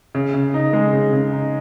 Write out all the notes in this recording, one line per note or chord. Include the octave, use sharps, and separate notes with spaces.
C#3
C#3
D#4
G#3
C#3
C#3
D#4